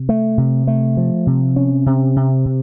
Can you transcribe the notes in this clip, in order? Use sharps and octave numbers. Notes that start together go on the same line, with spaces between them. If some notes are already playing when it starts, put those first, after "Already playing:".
Already playing: C3
A3
C3
A3
F3
C3
C#4
C3
C3
C3